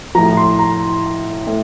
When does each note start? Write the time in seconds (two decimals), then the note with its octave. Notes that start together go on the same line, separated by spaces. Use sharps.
0.15 A2 F3 A#5
0.37 C6
0.59 A#5
1.47 A2